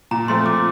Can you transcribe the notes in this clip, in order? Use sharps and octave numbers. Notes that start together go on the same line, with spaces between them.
A#2 A#5
F3 A3 C4 C6
A#2 D6